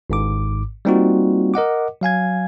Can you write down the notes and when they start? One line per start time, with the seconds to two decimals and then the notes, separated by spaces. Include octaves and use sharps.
0.10 G#1 G#2 D6
0.85 G3 A#3 C4 D#4 F4 F#4
1.54 A#4 D#5 F#5 D6
2.01 F#3 F5 G#5 G#6